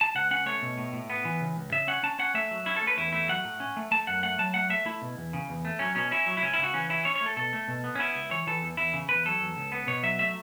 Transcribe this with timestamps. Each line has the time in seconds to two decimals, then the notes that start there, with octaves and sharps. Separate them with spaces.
0.01 A5
0.15 C#2 F#5
0.31 C#4 F#5
0.46 A3 C#5
0.62 B2
0.77 A2
0.93 A2
1.10 B3
1.25 E3
1.41 C#3
1.57 C#2
1.72 C#3 E5
1.88 C#4 F#5
2.03 C#4 A5
2.19 C#4 F#5
2.34 A3 E5
2.51 F#3
2.66 C#4 E4
2.76 A3 A4
2.87 B4
2.97 E2 E4
3.13 A3 E4
3.29 F#3 F#5
3.44 A2
3.60 C#4
3.77 A3
3.91 A3 A5
4.07 F#2 F#5
4.23 A3 F#5
4.38 F#3 A5
4.54 A3 F#5
4.69 A3 E5
4.85 A3 E4
5.02 B2
5.17 E2
5.33 C#3
5.49 E2
5.65 A3
5.79 F#3 C#4
5.95 B2 C#4
6.11 C#4 E4
6.26 F#3
6.37 E4
6.42 C#2 C#4
6.53 E4
6.58 C#3
6.63 F#4
6.74 E3 C#4
6.89 C#4 E4
7.05 C#4 C#5
7.15 C#5
7.21 A3 A4
7.37 B2 A4
7.53 A3
7.68 B2
7.84 B3
7.95 C#4
7.99 B3 E4
8.15 C#2
8.31 E3 C#5
8.47 E3 A4
8.62 E2
8.77 E2 E4
8.93 C#3
9.09 E2 B4
9.25 F#3 A4
9.40 E2
9.57 C#2
9.72 B3
9.87 B2 C#5
10.03 F#3 E5
10.19 A3 E5